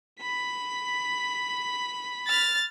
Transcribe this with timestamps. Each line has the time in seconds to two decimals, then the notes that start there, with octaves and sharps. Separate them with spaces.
0.20 B5 B6
2.27 F6 A6